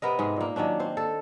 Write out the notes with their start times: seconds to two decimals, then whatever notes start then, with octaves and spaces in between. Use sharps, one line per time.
0.02 C3 B3 A#4 D#5
0.19 G#2 G#3
0.36 A#2 A#3
0.56 D#3 F#3 C#4 D4
0.80 C4 C5
0.97 A4